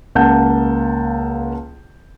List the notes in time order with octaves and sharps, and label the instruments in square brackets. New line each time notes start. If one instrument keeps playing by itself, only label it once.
[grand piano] C#2 A#3 F#5 A5 G6